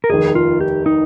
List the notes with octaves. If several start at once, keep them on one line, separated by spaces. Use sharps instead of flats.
A#4
F1 D#2 D#3 G#4
F4
G4
D#4